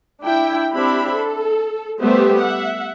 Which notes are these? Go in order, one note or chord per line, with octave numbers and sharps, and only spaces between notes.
D4 E4 G5
C4 D4 E4 G4 E5 B5
A4
G3 A3 B3 G4 C5 E5
E5 F#5